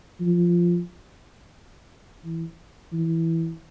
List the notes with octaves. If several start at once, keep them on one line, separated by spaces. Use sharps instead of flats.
F3
E3
E3